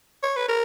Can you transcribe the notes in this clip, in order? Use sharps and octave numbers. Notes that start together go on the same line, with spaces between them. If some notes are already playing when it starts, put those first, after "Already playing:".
C#5
B4
A#4